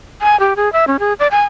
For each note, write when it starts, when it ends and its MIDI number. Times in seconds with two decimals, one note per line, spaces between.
0.22 0.39 80
0.40 0.53 67
0.56 0.71 68
0.73 0.85 76
0.87 0.97 61
0.99 1.13 68
1.19 1.27 74
1.31 1.43 80